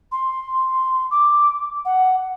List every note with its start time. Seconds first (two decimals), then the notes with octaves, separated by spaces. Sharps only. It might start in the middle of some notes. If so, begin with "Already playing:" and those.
0.12 C6
1.11 D6
1.85 F#5